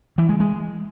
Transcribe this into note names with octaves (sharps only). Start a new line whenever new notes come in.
E3
G#3
G#3